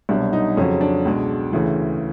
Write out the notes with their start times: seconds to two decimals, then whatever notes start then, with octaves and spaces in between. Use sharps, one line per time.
0.09 C2 B2 F#3 D4
0.33 D#4
0.57 F2 C#3 F#3 C#4
0.81 D4
1.05 C#2 B2 G#3
1.53 D2 C#3 E3